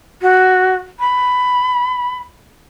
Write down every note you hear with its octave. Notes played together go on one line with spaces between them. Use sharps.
F#4
B5